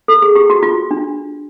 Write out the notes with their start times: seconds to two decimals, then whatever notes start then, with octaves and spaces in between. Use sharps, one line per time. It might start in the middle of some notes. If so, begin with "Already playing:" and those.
0.08 A4
0.22 G#4
0.35 G4
0.50 F#4
0.63 F4
0.91 D4